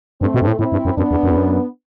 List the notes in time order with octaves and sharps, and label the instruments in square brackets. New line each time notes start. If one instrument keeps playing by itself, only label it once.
[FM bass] G2 [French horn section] A3 C4
[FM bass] B2
G2
A2
[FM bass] A2 [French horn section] C4 E4
[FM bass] G2
F#2
[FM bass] F#2 [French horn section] B3 D4
[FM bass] E2
F#2
E2
F#2